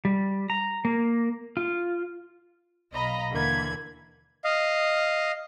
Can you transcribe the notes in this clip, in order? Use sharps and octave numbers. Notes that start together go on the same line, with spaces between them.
G3
A#5
A#3
F4
B1 D#5 F5 A#5 B5
D#2 D3 E3 A#3 B5 G#6
D#5 F5